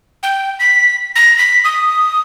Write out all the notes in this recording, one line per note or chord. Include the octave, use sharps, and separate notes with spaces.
G5
B6
A#6
B6
D#6